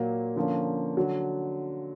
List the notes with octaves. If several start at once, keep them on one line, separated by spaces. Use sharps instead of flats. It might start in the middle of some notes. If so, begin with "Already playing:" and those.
Already playing: A#2 F#3 A#3
D3 F3 A#3 C#4
D3 F#3